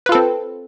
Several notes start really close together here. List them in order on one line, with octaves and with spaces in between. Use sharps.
B4 F4 A4 C4